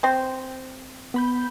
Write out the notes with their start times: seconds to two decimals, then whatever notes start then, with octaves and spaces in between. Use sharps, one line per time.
0.03 C4 C5
1.14 B3 B5 G6